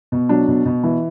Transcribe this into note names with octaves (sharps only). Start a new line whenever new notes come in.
B2
F#3 D4
B2
B2
E3